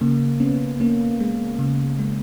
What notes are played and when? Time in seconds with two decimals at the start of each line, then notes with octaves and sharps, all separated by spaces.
0.01 C#3 A#3
0.40 B3 C#4
0.80 A#3 C#4
1.20 G#3
1.59 C#3
1.99 G#3